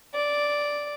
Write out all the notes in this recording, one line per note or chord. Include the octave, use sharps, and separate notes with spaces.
D5